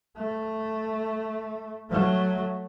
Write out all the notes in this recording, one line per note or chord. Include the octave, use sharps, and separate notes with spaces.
A3
F#3 A3